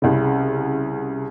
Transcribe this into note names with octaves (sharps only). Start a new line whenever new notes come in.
C2 C#3